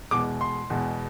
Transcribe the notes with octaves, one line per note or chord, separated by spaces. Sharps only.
E2 B2 G#3 D6
C6
E2 B2 G#3